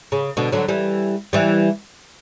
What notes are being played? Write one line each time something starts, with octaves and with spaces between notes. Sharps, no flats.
C#3
B2 D3
D3 F#3
E3 G3
E3 G3